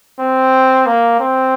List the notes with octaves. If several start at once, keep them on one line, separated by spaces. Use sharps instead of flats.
C4
A#3
C4